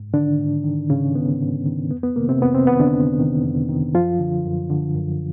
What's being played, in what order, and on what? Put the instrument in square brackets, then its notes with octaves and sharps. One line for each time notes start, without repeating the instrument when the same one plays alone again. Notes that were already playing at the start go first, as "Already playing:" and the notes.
Already playing: [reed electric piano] G#2
D3 D#3 D4
G#2
D#3
G#2 C#3 C#4
D#3 B3
G#2
D#3
F2 B3
B3
C3 D#3 A#3
C3 C4
F2 B3
C3 C4
C3 D#3 B3
D3 D4
F2
C3 D#3
F2
C3 D#3
F#2 F3 F4
D3
F#2
D3
F#2